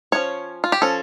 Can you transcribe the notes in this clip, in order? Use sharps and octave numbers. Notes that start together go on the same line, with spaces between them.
F3 A#3 C#4 C#5
F4
G4
F3 C#4 A4